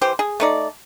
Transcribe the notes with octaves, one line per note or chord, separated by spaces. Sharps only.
E3 G4 C5
G#4
A3 D#4 D5